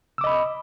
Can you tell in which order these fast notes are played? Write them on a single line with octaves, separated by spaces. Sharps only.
E6 D6 D#5 B5